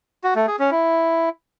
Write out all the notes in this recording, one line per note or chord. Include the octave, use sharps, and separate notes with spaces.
F#4
A3
G#4
C#4
E4